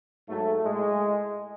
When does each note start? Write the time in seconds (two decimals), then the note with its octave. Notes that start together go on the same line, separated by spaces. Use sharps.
0.27 G#2 F#3 A3
0.62 A2 G#3